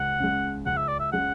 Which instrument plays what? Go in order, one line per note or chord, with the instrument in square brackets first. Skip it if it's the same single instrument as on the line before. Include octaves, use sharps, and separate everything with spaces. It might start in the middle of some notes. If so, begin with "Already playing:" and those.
Already playing: [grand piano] C#2 [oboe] F#5
[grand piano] C#3 G#3
[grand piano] C#2 [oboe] F#5
[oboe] E5
D5
E5
[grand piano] C#3 G#3 [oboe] F#5